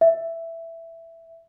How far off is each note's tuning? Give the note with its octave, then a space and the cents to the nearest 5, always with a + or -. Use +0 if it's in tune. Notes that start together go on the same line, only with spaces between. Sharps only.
E5 +5